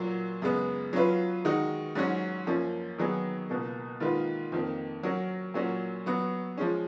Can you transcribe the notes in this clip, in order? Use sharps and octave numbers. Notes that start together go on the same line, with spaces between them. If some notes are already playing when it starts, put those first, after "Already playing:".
Already playing: A#2 F#3 A#3
F#2 C#3 G#3 B3
F#3 C#4 F4 B4
D#3 G#3 D#4 F#4
G#2 F#3 C#4 F#4
F#2 F3 A#3 C#4
D#3 F#3 B3 D#4 G#4
C#2 B2 A#3
G#2 D#3 A#3 F4 B4
F2 D#3 A#3
F#3 C#4 F#4 A#4
A#2 F#3 A#3 C#4 F#4
F#3 B3 F#4
F3 G#3 C#4